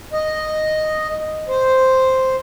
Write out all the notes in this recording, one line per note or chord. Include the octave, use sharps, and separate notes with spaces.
D#5
C5